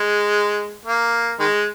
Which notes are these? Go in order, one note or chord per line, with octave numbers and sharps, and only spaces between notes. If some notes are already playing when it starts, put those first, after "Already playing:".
Already playing: G#3
A#3
D#3 G#3